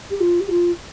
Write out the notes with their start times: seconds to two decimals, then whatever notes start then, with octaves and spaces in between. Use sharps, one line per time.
0.10 G4
0.20 F4
0.40 G4
0.50 F4